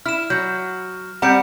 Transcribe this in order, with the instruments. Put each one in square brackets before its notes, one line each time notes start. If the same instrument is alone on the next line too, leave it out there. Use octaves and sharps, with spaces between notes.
[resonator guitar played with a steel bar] E4 [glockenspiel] F6 E7
[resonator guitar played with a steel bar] F#3 [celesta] G6
[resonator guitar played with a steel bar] G3 C4 [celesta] F#5 G6 [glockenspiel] A#5 C#7 D7